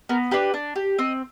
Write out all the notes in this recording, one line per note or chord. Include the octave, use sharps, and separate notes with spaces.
B3 A#4
D4 G4 B4
D4
G4
C4 D#5